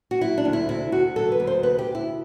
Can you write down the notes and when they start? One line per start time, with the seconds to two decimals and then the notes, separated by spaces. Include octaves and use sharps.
0.11 F#4
0.21 F#3 E4
0.38 D4
0.45 D2
0.53 E4
0.69 C3 E4
0.92 D2 F#4
1.16 F#3 A4
1.32 B4
1.40 D2
1.47 C5
1.63 C3 B4
1.79 G4
1.86 D2
1.95 E4